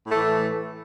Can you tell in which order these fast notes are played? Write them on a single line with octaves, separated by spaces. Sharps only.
A2 A3 E3